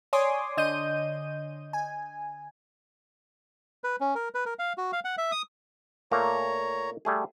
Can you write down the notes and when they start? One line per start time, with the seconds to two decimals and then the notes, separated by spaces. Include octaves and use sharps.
0.13 C#5 D5 G#5 C6 D6 D#6
0.57 D3 D#5 G6 D#7
1.73 G#5
3.84 B4
4.00 C#4
4.15 A#4
4.34 B4
4.46 A#4
4.59 F5
4.78 F#4
4.93 F5
5.05 F#5
5.18 E5
5.32 D#6
6.12 A#2 A3 A#3 C#5 A#5
7.05 G3 A3 G#4